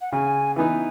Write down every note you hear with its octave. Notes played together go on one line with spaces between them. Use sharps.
F#5
C#3 G#5
E3 B3 D#4 G#5